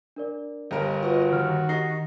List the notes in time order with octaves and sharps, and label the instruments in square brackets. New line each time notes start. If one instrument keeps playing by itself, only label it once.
[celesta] D4 A#4 D5
[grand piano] G1 G2 A#4 [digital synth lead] D#5
[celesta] F4 B4 [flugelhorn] F#4 [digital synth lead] D#5
[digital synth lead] D#3 [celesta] F6
[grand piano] D#4 [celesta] G4 A#6 C7